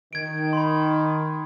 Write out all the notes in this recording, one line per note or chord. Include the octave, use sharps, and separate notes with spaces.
D#3 G#6 D7
B5 C6